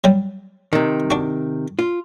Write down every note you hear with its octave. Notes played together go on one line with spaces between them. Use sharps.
F#3 G3
C3 D#3
D4 F#4
F4